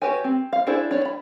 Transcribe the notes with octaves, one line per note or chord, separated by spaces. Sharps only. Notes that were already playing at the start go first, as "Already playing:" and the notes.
F#4 G4 B4 C#5 G#5
C4
F5
D4 E4 G#4 A4 C5
D4 C#5
B5